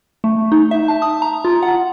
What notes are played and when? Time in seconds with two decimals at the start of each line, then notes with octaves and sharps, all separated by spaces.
0.24 A3
0.52 D#4
0.71 E5
0.88 A5
1.02 D#6
1.22 A#5
1.45 F4
1.63 F#5